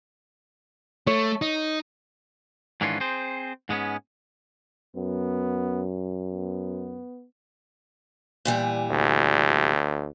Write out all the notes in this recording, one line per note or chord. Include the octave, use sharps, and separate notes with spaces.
A3 C#5
D#4
G#2 D#3 E3 C#4 D4 F4
C4 G#4 C5
G#2 G#3 B3 C#4
F#2 B3
B3
A#2 E3 G3
D2